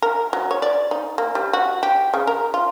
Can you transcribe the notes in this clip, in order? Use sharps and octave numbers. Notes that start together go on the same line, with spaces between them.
A#4
F#3
C#5
D5
D#4
A#3
G3
F#4
G4
C#3
A#4
F4